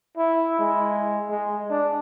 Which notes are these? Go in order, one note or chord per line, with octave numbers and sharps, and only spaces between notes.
E4
G#3
G#3
D4